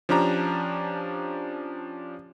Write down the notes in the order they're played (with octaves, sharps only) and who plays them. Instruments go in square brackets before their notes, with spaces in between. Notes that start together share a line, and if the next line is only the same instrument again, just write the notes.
[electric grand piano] F3 C#4 D4 G4 A#5